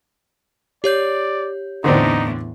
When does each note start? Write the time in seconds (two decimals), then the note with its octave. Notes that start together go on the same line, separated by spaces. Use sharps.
0.84 G4 C#5 D5 G6
1.84 E2 A2 D3 C4 D4 D#4